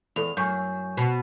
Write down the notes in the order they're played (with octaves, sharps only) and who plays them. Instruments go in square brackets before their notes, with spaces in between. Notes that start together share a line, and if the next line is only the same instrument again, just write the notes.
[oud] E2 [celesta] A4 F7
[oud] F#2 [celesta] G#5 C#6 G6
[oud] B2